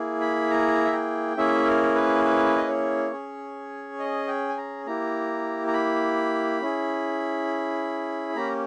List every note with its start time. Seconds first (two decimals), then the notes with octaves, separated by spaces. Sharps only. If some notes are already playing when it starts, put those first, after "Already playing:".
Already playing: A#3 E4 G#4
0.21 B5
0.50 A#5
0.85 E5
0.93 G5
1.37 A#3 C#4 E4 G#4 E5
1.67 A#4
1.95 B4
2.25 B4
2.57 D#5
2.67 C#5
3.12 C#4 G#4
3.99 D#5
4.28 G5
4.49 G#5
4.57 A#5
4.86 A#3 E4 G4 A#5
5.68 A#5
5.73 B5
6.62 C#4 E4 G#4
8.35 A#3 C#4 G4 A#5